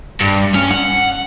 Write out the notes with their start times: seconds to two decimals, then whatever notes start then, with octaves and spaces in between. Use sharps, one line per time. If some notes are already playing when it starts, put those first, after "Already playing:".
0.21 G2
0.55 C#4
0.71 F#5